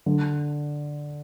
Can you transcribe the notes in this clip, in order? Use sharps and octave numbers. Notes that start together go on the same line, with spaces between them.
D3